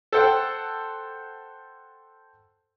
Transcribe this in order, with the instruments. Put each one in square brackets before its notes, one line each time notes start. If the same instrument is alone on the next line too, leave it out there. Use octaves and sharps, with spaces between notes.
[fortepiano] A4 C5 F#5 G5